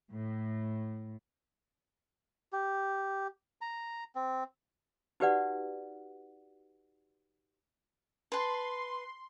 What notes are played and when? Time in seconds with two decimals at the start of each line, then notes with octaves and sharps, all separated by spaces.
0.11 A2
2.53 G4
3.61 A#5
4.15 C4
5.20 D#4 F#4 G4 B4 D5 F#5
8.32 B4 A5 C6